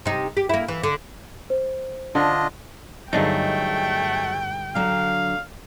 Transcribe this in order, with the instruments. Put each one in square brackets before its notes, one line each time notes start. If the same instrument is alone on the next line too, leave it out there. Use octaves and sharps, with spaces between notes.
[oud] C3 D#4
G4
A#3 E4
E3
D3
[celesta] C5
[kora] D3 [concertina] D4 F4 D#5
[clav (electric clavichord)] G1 D4 D#4 [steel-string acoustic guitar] F#3 G#4 D#5 [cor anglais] A3 [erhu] G5
[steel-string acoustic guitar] D3 F#3 [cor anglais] F5